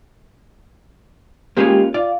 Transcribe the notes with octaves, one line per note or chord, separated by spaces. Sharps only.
G#3 A#3 C#4 F4 G4 C5
F4 D5